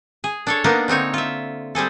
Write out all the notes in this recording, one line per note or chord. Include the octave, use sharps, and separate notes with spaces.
G#4
D4 A4 C#5
A#3 B3 D4 D#4
D3 C4 D#4 C#5
F4 E5
G3 C4 G#4 A4